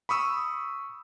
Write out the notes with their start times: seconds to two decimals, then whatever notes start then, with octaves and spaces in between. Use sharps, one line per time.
0.09 B5 C#6 D#6 E6